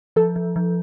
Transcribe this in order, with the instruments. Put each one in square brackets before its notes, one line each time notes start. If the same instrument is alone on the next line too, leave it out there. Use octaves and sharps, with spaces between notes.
[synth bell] F3 [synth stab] A4
[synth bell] F3
F3